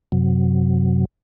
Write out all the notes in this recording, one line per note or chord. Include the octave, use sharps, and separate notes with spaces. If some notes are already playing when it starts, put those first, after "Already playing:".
F#2 C3 F#3